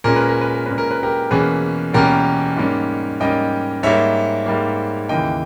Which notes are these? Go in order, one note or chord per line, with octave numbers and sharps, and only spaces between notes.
A#2 G#3 C#4 A#4
B4
A#4
B4
A#4
A#2 G#3 C#4 B4
A#4
B4
G4 A#4
E2 B2 A#3 C#4 G#4 B4
E2 B2 A#3 C#4 G4 A#4
G#2 G3 A#3 C#4
G#2 G3 A#3 C#4 D#5 G5
G#2 G3 A#3 C#5 E5
G#2 G3 A#3
D#2 C#3 E3 A#3 D#5 G5